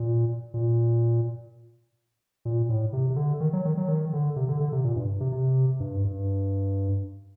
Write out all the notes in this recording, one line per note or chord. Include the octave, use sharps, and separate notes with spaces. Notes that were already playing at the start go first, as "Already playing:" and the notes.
Already playing: A#2
A#2
A#2
A2
C3
C3
D3
D#3
F#3
D#3
F#3
D#3
D3
C3
D3
D3
C3
A#2
G2
C3
C3
G2
G2